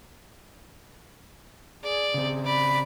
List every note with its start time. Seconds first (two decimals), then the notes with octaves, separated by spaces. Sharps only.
1.83 G#4 D5
2.14 C#3 C4
2.45 D5 B5